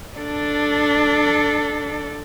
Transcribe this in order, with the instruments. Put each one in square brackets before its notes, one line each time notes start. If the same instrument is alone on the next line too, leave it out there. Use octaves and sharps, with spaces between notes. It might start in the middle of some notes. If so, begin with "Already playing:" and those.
[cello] D4 A4